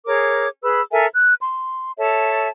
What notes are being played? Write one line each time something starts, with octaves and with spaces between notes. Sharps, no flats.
G#4 A#4 C#5 D6
G#4 B4 B5 E6
A4 A#4 E5 G#5
F#6
C6
A4 C#5 E5 A5